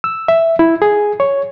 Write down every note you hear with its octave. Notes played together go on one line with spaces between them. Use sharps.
E6
E5
E4
G#4
C#5